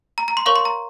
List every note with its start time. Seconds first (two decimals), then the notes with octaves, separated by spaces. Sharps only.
0.18 A#5
0.28 A#5
0.37 C6
0.46 A#4 C#5 F5 C#6
0.56 C6
0.65 A#5